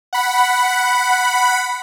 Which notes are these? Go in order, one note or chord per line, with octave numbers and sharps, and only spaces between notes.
F#5 B5